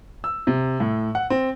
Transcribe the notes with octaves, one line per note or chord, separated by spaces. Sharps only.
E6
C3
A2
F#5
C4